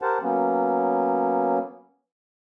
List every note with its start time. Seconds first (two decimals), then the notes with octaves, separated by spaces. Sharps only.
0.02 G4 A#4 C5 F#5 A5
0.23 F#3 A#3 B3 C#4